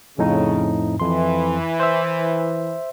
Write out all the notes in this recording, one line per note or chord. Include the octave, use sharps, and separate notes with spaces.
F2 A2 C#3 D#4
F2 E3 C6
C5 E5